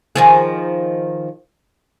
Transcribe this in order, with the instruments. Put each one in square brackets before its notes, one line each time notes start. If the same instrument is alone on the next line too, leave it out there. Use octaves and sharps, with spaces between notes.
[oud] D#3 F3 G#4